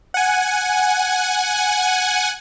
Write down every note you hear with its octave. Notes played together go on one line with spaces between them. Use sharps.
F#5 G#5